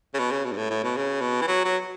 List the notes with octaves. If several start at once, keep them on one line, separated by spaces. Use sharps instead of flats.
C#3
B2
C#3
B2
G2
A2
A2
B2
C#3
B2
E3
F#3
F#3